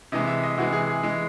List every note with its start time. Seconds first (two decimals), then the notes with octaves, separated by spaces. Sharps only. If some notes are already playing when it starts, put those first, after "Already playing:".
0.12 C3 E3 G#3 D#5
0.27 E5
0.43 D#5
0.58 C3 E3 G#3 F#4
0.72 G#4
0.88 G#4
1.03 E3 G#3